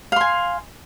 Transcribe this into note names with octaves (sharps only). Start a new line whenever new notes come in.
F5 G#5 C6